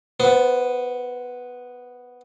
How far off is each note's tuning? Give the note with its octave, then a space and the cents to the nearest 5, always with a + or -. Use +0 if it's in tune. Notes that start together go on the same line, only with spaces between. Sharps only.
B3 +0 C5 -20